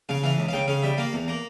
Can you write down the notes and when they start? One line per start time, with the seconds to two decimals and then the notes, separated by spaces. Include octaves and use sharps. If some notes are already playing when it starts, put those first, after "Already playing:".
0.09 C#3 F5
0.23 E3 F5
0.38 C#2
0.49 F5
0.53 C#3 G5
0.68 C#3 F5
0.82 G3 E5
0.97 A#3 F5
1.13 E2
1.28 A#3